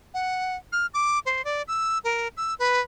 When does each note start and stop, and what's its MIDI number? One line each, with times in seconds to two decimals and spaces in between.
0.14 0.56 78
0.72 0.86 89
0.94 1.19 86
1.26 1.44 72
1.45 1.62 74
1.68 1.98 88
2.04 2.28 70
2.37 2.54 88
2.59 2.80 71